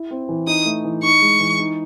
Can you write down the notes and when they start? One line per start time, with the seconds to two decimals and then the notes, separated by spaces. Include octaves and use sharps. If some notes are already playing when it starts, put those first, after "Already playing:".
Already playing: E4
0.11 C4
0.29 E3
0.47 D#4 D#6
0.65 A3
0.84 E3
1.02 D#4 C#6
1.22 G#3
1.40 E3
1.59 D#4